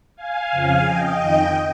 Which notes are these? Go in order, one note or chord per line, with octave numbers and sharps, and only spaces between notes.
F5 G#5
F2 C#3 F3
D#5 G5
F2 D#3